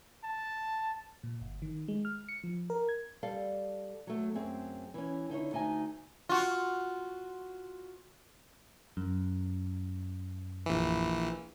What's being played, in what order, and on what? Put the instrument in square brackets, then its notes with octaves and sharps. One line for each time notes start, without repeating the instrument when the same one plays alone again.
[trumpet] A5
[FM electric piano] A#2
G1
D#3
G#3
F6
C#7
F3
A#4
G#6
[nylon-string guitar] G3 A4 F5
F#3 A3
F#2 C4 G#4 E5
E3 C#4
D3 D#4 E4 C#5
D2 D#4 E5 G#5
[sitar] F4 F#4
[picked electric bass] F#2
[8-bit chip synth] A#1 E3